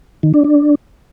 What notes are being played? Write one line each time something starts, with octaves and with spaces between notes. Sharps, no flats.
D#3
D4
D4